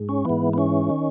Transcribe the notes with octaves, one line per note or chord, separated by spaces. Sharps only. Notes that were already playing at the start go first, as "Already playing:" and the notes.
Already playing: G#2
C#4
G#2 E3 B3
B3
C#4
D#3